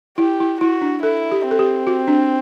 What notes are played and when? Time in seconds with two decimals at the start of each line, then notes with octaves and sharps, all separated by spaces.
0.18 E4 G4
0.40 E4
0.61 E4 F#4
0.82 D4
1.03 E4 A4
1.32 G4
1.45 C4
1.51 A4
1.59 G4
1.87 F#4
2.08 D4